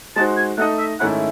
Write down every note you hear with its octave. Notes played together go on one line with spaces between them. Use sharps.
G#3 D#4 F#4 C5 A5
G#5
A3 D#4 A4 D#5 F#5
E5
G#2 D#3 A3 C#4 E4 F#5